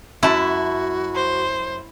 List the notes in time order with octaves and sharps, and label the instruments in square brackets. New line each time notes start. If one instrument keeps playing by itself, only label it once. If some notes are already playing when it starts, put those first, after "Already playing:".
[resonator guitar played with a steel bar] F#2 A5 [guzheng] E4 [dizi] F#4
[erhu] C5